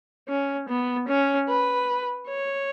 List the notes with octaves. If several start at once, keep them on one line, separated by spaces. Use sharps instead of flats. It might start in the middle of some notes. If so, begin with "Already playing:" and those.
C#4
B3
C#4
B4
C#5